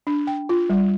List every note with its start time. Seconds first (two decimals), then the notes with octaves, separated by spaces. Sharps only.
0.07 D4
0.27 G5
0.49 F4
0.70 G3